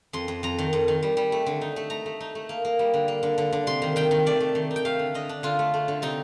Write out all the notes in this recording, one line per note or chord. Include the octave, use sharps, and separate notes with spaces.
F2 C6
F2
F2 A#5
D#3
F2
D#3
G3
G3
A3
D3
D#4
A3
A3 A#5
A3
D#4
A3
A#3
A#3
G3
D3
A#3
D3
D3
D3
C3 C6
D#3
D#3 G5
D#3
A3 D5
A3
D#3
D#4
G5
A3 F5
D3
D3 D#5
D4
D3 F4
A3
A3
D3
C3 D#4